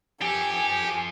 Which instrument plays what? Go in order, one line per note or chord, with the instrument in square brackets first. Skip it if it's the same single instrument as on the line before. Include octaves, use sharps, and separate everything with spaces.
[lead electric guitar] F3 A4 [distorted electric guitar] G4 [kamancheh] G#5